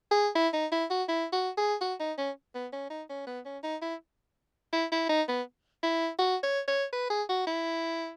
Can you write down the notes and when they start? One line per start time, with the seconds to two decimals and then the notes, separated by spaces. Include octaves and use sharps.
0.12 G#4
0.35 E4
0.54 D#4
0.72 E4
0.91 F#4
1.09 E4
1.33 F#4
1.58 G#4
1.81 F#4
2.00 D#4
2.18 C#4
2.55 B3
2.73 C#4
2.90 D#4
3.10 C#4
3.27 B3
3.46 C#4
3.64 D#4
3.82 E4
4.73 E4
4.92 E4
5.09 D#4
5.29 B3
5.83 E4
6.19 F#4
6.43 C#5
6.68 C#5
6.93 B4
7.10 G#4
7.29 F#4
7.47 E4